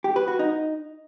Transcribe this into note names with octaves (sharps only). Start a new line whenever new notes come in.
G4
B4
F#4
D#4